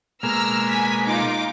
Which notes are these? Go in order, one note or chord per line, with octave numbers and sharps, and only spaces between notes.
B2 G#3 A#3 A#5 E6 F6
G#5 B6
D#4 F4 D6